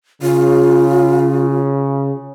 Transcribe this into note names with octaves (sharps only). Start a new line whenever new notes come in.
C#3 F4